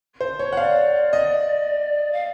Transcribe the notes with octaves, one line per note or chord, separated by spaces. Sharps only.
C5
C#5
F#5
D5 F5
D#5
F5